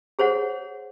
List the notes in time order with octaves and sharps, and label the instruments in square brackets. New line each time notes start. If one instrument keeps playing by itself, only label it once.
[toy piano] G#4 C5 C#5 F#5